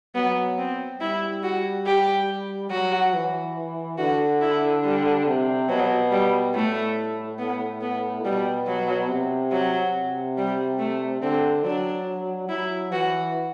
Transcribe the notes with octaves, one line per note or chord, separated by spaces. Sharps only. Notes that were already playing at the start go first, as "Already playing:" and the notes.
F#3 B3
C4
G3 E4
F#4
G4
F#3 F#4
E3
D3 F#4
E4
G3
C3
B2 F#3
G3
A2 A3
B3
B3
B2 G3
F#3
C3
F#3
C3
G3
A3
D3 C4
F#3 D4
F#3 E4
E3 F#4